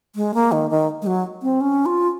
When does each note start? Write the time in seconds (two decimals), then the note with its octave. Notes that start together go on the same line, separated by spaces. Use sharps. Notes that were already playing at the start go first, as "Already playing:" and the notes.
0.15 G#3
0.34 A#3
0.52 D#3
0.70 D#3
1.02 G#3
1.07 F#3
1.42 C4
1.61 C#4
1.86 F4